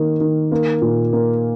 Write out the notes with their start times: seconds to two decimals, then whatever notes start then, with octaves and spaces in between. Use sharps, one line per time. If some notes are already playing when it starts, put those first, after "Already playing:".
Already playing: D#3 A#3
0.20 D#3
0.52 A#3
0.82 A#2
1.13 A#3